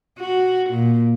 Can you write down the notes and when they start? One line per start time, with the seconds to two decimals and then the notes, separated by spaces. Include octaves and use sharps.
0.19 F#4
0.70 A#2